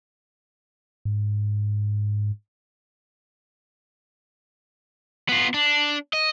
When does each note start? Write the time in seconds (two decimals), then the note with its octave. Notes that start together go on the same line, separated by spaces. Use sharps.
1.05 G#2
5.29 B3 F4
5.54 D4
6.13 D#5